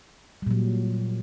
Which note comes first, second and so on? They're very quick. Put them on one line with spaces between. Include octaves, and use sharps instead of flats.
G3 A#2 F#3